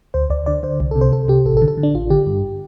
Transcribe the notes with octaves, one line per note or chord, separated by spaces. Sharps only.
D2 C5
D2 D5
D3 D5
D3 C5
C2
C3 A4
C5
C2 A4
C3 G4
A1 A4
A4
D3
A4
D3
D4
A1 F4
D3 G4
G2